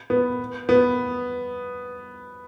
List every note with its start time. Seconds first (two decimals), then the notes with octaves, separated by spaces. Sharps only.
0.10 B3
0.69 B3